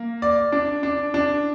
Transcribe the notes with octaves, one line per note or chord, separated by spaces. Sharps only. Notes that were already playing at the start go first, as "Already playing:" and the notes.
Already playing: A#3
D5
D4
D4
D4